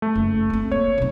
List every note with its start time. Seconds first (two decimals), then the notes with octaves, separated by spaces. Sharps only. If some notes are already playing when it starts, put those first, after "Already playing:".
0.02 A3
0.15 F#1
0.50 B3 C4
0.72 A#3 C#5
0.98 B1 C3